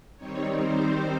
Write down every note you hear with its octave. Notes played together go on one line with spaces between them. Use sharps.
D#3 G3 C4 D#4 C#5
C5